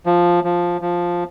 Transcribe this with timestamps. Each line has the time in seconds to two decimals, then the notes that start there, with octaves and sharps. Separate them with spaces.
0.06 F3
0.44 F3
0.81 F3